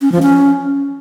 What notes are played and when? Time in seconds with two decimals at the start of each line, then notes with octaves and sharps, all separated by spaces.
0.02 C#4
0.12 F3
0.22 C#4